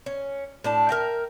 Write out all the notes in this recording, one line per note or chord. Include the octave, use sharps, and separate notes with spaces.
C#4
A2 D4 A5
A#4 E5 G5